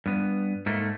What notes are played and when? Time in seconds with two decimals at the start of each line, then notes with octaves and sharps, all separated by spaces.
0.06 G2 B3
0.66 G#2 A3 A#3